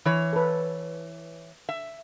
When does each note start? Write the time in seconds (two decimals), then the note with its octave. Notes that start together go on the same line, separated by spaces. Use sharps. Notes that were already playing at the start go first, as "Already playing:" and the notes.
0.05 E3 C#5
0.33 A4 B4
1.69 E5